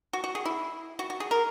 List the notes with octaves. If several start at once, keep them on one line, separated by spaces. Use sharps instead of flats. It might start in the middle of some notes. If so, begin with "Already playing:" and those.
F#4
F#4
G#4
E4
F#4
F#4
G#4
A#4